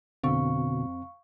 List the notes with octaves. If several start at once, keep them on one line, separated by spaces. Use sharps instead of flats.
F2 B2 D3 C4 F5 C#6